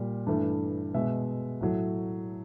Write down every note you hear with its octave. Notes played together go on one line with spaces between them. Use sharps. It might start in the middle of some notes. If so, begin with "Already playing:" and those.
Already playing: A#2 G3
G2 E3 A3
B2 G#3 E5
A2 F#3 A3